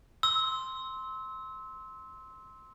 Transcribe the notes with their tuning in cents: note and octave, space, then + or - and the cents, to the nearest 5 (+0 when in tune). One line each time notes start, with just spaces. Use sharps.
C6 +0 E6 -30